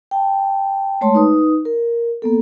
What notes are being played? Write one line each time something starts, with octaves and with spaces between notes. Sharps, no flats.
G5 A5
G#3 A3 C#5 A5 C6
D#4 B4 D#6
A#4
A#3 B3 A4